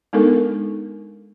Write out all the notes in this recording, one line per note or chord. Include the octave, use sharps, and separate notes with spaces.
G#3 B3 D4 D#4 A4 A#4